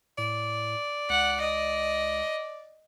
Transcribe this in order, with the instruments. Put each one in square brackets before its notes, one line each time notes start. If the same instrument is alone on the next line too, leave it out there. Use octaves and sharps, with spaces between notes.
[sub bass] A2 [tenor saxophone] D5
[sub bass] C#2 [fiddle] F#5
[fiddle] D#5